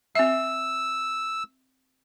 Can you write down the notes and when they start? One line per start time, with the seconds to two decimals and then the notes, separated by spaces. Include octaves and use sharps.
0.15 C4 E5 E6